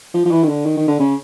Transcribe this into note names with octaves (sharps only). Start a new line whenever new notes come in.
F3
F3
E3
D#3
D3
D#3
D#3
D3
C#3